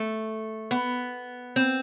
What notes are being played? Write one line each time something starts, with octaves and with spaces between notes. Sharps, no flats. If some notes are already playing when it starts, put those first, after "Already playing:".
Already playing: A3
B3
C4